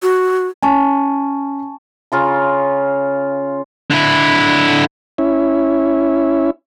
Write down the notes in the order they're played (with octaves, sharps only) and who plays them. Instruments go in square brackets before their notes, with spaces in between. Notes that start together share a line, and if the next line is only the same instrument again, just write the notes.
[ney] F#4
[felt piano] C#4 [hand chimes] G#5 A5 C#6
[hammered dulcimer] C#3 F4 A#5
[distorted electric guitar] D3 E4
[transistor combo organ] C#4 E4